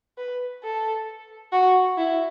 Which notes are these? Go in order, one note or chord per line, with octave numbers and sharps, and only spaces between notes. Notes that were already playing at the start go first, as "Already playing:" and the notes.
B4
A4
F#4
E4